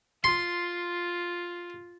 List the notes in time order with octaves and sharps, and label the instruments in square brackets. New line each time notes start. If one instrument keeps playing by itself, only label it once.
[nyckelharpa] F4 [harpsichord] C6